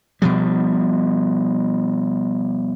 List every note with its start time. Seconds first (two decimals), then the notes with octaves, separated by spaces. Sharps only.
0.22 B2 F3 G3